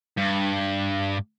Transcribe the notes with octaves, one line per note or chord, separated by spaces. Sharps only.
G2